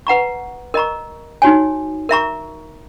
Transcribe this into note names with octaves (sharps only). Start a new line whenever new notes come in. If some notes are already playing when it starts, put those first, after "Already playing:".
B4 F#5 A#5 C#6
A#4 D#5 A#5 C#6
D#4 F#4 C#5 G#5
A#4 E5 A#5 C#6